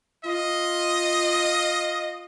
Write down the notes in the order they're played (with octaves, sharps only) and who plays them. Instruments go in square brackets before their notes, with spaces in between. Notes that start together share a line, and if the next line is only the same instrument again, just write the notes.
[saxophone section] F4 [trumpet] D#5